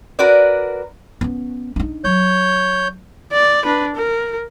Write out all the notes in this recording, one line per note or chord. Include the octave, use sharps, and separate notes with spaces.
F#4 A#4 B4 D5
B3 C#4
D4 D#4
F#3 C#5 G6
D5
D4 B4
A#4